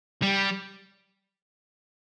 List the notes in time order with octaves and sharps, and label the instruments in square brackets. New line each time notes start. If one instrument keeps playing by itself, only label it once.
[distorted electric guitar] G3